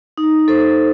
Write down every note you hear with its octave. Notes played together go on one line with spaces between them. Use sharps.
D#4
A4 C5